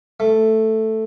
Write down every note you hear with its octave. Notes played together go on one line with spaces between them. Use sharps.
A3